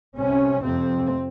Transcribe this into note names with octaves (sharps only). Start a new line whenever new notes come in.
C2 C3 C#4
F2 C3 C4